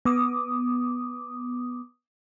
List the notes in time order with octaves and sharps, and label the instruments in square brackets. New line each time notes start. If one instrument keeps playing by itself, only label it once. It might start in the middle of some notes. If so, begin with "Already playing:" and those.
[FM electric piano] B3 D6 D#6